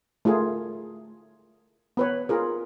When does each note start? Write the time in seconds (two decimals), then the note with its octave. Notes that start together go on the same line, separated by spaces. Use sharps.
0.25 A3 F4 G#4 A#4
1.97 B3 B4 C#5
2.29 F4 G#4 A#4